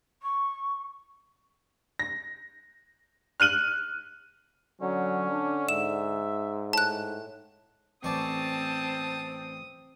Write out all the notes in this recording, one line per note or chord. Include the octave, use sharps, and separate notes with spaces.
C#6
A#6
F6 F#6 D#7 F#7
D3 F#3 C#4
D4
G#2 E5 E7
A2 A5 F#6
A1 C4 D5 A5 C#6 D#6